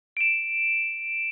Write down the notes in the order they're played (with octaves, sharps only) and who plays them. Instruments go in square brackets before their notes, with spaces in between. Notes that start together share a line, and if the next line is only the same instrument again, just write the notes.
[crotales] D7 E7